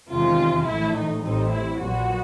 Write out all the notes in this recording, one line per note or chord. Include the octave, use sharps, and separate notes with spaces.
E2 C3 D#3 G#3 F4
A#1 A2 E3 A3 E4
D#4
A1 A2 E3 G3 C4 D#4
E4
A#1 A#2 F#3 B3 F#4